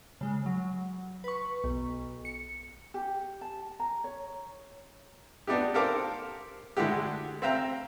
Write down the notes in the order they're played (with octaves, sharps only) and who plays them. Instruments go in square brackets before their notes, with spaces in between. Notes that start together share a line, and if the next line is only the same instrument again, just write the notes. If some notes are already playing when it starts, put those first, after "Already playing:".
[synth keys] C#3 G#3
F#3
B4 C#6
B1
C#7
[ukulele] G4
A5
A#5
C#5
[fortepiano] B3 D4 D#4 G4
G4 A4 A#4 C5 F5 D6
D3 G#3 E4 F#4 G4
C4 E5 F5 G5 A#5